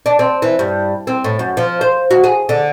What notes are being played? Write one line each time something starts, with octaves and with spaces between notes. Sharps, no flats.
D4
C4
E3
G2
C4
A2
F#2
F3
C5
F#4
G#4
D3